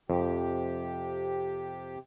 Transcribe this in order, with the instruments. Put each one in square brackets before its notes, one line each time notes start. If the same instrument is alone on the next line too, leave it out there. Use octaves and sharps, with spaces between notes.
[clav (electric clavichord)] F2 [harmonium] C3 G4